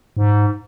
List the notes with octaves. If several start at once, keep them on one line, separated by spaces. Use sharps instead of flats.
G#2